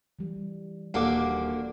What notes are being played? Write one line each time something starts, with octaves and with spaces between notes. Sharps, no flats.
E3 G3
D#1 A#3 D4 F#4 A4 F5 F#5 D6